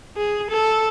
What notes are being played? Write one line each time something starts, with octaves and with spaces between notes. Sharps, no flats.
G#4
A4